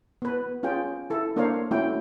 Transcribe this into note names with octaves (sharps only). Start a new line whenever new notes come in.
B3 B4
C#4 F4 G#4 G5
E4 A4
A#3 D4 A#4 C5 C#5 F5
A3 C#4 E4 F#4 G5